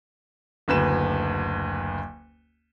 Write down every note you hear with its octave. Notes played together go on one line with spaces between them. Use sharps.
F#1 D2 B4 E7